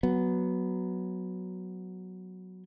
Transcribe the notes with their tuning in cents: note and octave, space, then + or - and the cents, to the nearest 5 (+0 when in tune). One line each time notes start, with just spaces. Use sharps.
F#3 +0 B3 +0